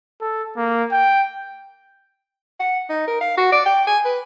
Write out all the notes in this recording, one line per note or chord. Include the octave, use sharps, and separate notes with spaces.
A4
A#3
G5
F#5
D#4
A#4
F5
F#4
D5
G5
G#5
B4